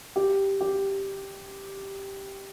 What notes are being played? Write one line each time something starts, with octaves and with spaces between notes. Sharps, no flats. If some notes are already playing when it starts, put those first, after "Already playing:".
G4
G4